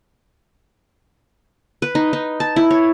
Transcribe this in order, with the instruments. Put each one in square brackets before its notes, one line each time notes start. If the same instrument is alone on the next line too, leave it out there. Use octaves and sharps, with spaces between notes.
[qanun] B4
D#4
D#4
A5
E4
C#5